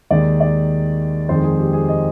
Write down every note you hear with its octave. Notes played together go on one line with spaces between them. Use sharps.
D#2 D#3 G#3 D5
D5
F2 D#3 G#3 C5
G#4
G4
G#4
D#5